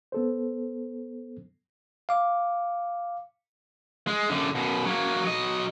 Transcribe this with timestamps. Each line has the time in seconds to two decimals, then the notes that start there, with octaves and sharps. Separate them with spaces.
0.12 B3 A4 C5
2.09 F5 D6
4.07 G#3
4.29 F#2 D3
4.55 F#2 B2
4.85 F#3 A#3
5.24 F#3 D#5